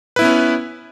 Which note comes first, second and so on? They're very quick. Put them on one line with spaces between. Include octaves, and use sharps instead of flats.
B4 E4 B3 C#4